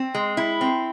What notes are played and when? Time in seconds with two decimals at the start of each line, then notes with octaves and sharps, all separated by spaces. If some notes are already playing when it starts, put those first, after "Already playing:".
Already playing: C4
0.15 G#3
0.37 E4
0.61 C4